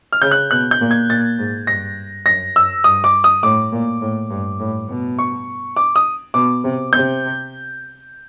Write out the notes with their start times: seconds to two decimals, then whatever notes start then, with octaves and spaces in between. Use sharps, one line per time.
0.13 F6
0.22 C#3 G6
0.31 F#6
0.51 B2 F#6
0.71 G6
0.81 A#2
0.91 G#6
1.10 A#2 A6
1.39 G#2
1.67 G2 A#6
2.26 F#2 A#6
2.56 F#2 E6
2.84 G2 D#6
3.04 D6
3.24 D#6
3.43 A2 D6
3.72 A#2
4.01 A2
4.30 G2
4.59 A2
4.89 B2
5.19 C#6
5.77 D6
5.96 D#6
6.34 B2 D6
6.64 C3
6.93 C3 G6